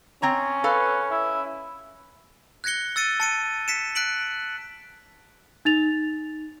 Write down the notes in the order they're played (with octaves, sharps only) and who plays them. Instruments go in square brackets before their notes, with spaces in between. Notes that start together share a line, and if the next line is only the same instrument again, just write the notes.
[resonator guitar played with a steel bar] C4 C#5 A#5 [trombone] C#4
[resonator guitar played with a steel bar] A4 F5 [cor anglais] B4
[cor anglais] E4
[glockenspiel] F#6 G#6 A#6 C#7 G7
E6 A6 C#7 D#7
A5 C#7 D#7
B6 C#7 E7
F#6 B6 D7 F#7
[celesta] D#4 A6 F7